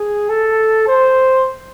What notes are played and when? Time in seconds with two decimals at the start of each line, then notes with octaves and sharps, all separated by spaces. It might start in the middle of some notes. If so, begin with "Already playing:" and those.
Already playing: G#4
0.29 A4
0.88 C5